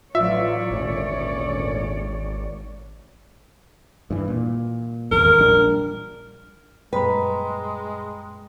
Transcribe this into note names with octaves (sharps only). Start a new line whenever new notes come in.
A1 E3 F#3 F4 C#5 D5 E5
G#1 D2 A#2 C#4
G2 E3
A#2
G#1 E2 A#4
A#1 G3 D4
F#2 A#2 G3 G#3 B4 G5 A#5 B5